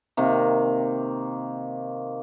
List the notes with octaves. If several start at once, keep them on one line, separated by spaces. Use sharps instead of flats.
C3 D#3 A#3